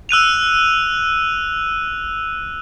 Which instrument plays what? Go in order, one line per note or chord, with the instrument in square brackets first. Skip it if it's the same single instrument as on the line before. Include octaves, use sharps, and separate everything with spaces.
[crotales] E6 F#6 D#7 F7